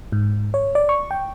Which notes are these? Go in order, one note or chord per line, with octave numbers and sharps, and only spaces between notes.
G#2
C#5
D5
C#6
G5